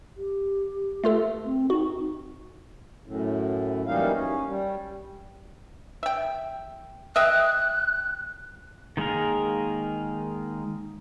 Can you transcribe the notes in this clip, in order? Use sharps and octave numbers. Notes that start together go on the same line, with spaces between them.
G4
A3 F4 A4
C4
D#4 F#4
F#2 A2
F#2 E3 G3 A#3 D#4 F5
C#4
G3
E5 G5
D#5 E5 G5 F#6
D#3 G#3 A#3 G#4 A#4